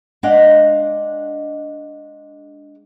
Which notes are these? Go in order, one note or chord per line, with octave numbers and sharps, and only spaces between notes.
G#3 D4 D#5 F5 F#5